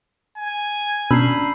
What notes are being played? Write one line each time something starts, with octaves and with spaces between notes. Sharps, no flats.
G#5
B2 C#4 D4 A#5 B5 E6 C7